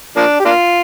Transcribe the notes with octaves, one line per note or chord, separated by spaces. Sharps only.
F3 A#3 D4
G4
A#3 D4 F4